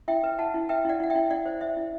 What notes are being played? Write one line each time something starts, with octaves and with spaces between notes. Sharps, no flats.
E4 E5 G5
B4
E4 F#5 A5
E4
B4 E5 G5
E4 D5 F#5
E4 F#5
E5 G5
E4
E4 D5 F#5
C5
C5 E5
E4